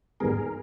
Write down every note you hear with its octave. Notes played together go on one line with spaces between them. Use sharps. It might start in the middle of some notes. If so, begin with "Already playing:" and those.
G#2 D#3 G3 B3 G#4 A#4